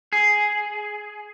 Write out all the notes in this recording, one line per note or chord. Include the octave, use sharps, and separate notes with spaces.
G#4